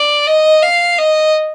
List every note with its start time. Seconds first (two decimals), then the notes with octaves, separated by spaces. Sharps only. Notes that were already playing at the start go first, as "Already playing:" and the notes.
Already playing: D5
0.27 D#5
0.63 F5
0.98 D#5